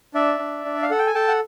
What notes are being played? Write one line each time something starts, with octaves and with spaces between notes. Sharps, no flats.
D4 D5 E5
D4
D4
F5
A4 F#5
G5
G#5
A4 G5 A5
F#5